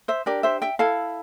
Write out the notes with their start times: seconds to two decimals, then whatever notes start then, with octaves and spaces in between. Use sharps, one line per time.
0.08 C5 E5
0.26 D4 G4 A#4 D5
0.43 C5 E5
0.62 E5 G5
0.79 E4 A4 F5 A5